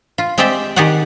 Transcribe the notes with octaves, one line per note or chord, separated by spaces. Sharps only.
F4
G#3 C4 G4 D5 E5 G5
D#3 G4 G#4 D5 F#5